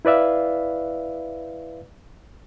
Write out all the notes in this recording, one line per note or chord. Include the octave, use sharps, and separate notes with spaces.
E4 B4 D5 E5 F5